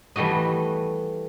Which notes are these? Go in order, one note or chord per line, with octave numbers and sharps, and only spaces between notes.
E3 G3 A3 F#4 D#5